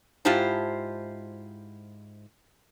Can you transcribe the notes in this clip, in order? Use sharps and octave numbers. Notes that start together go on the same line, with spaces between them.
G#2 E4 F4 G4 C5 A5